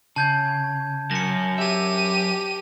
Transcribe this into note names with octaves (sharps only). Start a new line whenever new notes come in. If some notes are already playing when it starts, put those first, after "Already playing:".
C#3 A5 G6 G#6
F#2 A#6 C#7
G4 E5 D#7